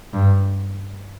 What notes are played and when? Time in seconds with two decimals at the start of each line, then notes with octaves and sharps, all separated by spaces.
0.13 G2